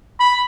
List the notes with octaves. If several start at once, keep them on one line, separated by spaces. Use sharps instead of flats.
B5